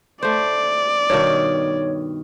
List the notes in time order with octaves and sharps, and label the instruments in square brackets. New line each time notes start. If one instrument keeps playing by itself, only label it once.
[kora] A3 C5 [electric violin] D5
[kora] G2 B2 D#3 [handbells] C#5